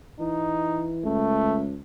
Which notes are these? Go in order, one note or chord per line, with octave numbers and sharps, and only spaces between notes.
E3 D#4
C#2 A3